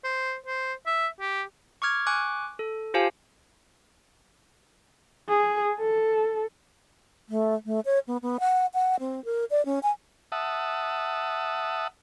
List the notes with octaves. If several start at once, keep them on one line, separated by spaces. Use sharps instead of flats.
C5
C5
E5
G4
C#6 D6 F6 G#6
G#5 C#6 D6 F#6
A4
F4 G4 C5 F5 G#5 A5
G#4
A4
A3
A3
C#5
B3
B3
F#5
F#5
C4
A#4
D5
C#4
G#5
E5 F#5 A5 D#6